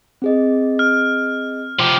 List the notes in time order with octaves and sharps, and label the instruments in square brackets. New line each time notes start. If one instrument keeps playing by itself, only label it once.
[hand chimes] C4 G#4 D#5
[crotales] F6
[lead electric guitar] F3 G4